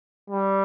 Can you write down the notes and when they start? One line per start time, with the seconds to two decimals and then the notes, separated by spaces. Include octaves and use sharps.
0.30 G3